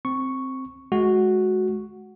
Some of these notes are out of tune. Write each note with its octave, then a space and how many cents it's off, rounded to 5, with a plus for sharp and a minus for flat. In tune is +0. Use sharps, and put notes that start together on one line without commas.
C4 +0 C#6 +0
G#3 +25 F#4 +0